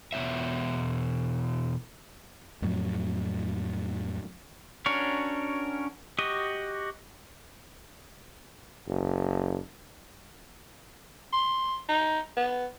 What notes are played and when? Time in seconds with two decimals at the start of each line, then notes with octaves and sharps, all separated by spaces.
0.13 E2 B2 C#4 C#5 E5
2.62 F2 A2 F#3
4.86 C#4 D4 F#4 A#4 C#5
6.19 F#4 G4 D#5 D#6
8.88 F#1
11.33 C6
11.89 D#4
12.37 B3